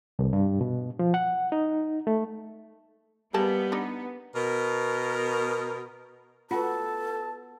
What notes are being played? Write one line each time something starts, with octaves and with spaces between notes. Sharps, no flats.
C2
G2
B2
F3
F#5
D#4
A3
G3 G#3 A#3 B3 A5
D4 D#4
B2 A#4
B3 F4 F#4 A4 A5